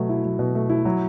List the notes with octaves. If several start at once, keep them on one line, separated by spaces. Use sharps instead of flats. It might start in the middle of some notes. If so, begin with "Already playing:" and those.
Already playing: B2 F#3 A3
E4
F#3
B2
A3
E4
F#3